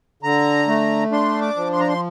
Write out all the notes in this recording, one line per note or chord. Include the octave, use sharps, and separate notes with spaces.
D3 A#5
A3
D4 C6
D6
F3
C6
A#5
C6